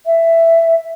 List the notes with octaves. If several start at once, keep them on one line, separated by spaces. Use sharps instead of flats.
E5